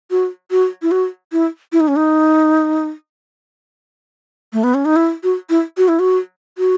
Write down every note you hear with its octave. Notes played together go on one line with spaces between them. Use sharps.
F#4
F#4
E4
F#4
E4
E4
D#4
C#4
D#4
A3
B3
C#4
D#4
E4
F#4
E4
F#4
E4
F#4
F#4